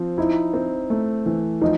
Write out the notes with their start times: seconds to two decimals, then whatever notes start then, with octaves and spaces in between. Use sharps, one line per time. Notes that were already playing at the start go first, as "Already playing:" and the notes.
Already playing: F3 C4
0.18 D#4 E4
0.54 C4
0.90 A3
1.26 E3
1.61 F3 D#4